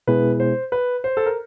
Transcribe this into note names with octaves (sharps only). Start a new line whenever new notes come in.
B2 G#3 B3 E4 G#4 B4
C5
B4
C5
A4
A#4